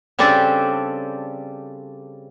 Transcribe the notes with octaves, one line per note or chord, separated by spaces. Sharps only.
C#3 G3 C4 D4 G4 A4